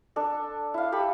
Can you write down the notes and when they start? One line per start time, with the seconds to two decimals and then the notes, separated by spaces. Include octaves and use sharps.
0.16 D4 A4
0.74 E4 F5
0.92 G4 A4 B5